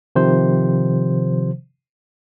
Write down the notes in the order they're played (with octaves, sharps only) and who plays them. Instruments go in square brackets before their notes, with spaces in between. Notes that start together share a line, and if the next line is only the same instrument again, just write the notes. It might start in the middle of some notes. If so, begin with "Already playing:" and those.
[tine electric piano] C3 D#3 F3 C5